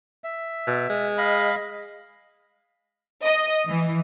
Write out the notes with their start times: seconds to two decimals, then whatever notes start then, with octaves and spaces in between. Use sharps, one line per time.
0.24 E5
0.67 B2
0.89 G#3
1.18 D#5 F5 B5
3.25 D#5
3.67 E3